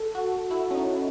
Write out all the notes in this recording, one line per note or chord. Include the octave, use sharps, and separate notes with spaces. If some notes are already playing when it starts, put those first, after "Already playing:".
Already playing: A4
F#4
E4
C#4
D#4